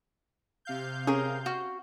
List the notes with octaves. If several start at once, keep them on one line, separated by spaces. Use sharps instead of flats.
C3 F5 G6
C#4 G#4 A#4
F#4